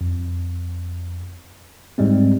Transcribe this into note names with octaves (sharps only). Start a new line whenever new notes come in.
F2
G#2 G3 G#3 C4